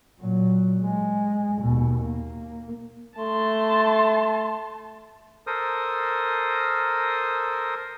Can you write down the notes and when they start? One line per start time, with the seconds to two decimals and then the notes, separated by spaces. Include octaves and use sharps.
0.21 A#2 F#3
0.84 G#3
1.62 D#2 B2
2.04 A#3
3.19 A3 A5 C6
5.47 A4 A#4 C5 D#6